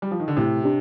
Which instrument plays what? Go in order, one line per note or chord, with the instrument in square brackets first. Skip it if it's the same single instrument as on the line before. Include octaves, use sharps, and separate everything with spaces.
[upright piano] G3
F3
D#3
D3
[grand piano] A2 [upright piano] C3
[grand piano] D4 G4